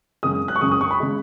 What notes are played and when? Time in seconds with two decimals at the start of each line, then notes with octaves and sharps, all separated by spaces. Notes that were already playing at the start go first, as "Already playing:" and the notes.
0.23 F#2 C#3 G#3 D#6
0.48 F#6
0.56 C#6
0.61 F#2 C#3 G#3 D#6
0.71 D#6
0.81 C#6
0.91 B5
1.00 C#3 G#3